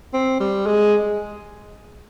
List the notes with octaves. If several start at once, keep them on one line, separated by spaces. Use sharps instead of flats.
C4
G3
G#3